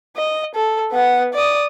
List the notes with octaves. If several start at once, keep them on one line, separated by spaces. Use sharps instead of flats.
D#5
A4
B3 F#5
D5 D#6